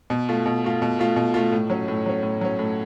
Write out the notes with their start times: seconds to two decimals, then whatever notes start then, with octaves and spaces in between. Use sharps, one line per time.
0.10 B2
0.29 A3 F4
0.46 B2
0.64 A3 F4
0.82 B2
0.99 A3 F4
1.16 B2
1.34 A3 F4
1.52 A2
1.70 F#3 C#4
1.88 A2
2.06 F#3 C#4
2.23 A2
2.41 F#3 C#4
2.59 A2